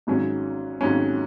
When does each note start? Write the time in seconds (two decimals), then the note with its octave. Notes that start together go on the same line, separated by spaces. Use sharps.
0.07 G#1 G#2 F#3 C#4
0.81 G#1 G#2 F#3 C#4